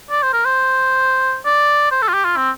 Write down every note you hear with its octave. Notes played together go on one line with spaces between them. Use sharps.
D5
C5
A#4
C5
D5
C5
A4
F4
G4
F4
C4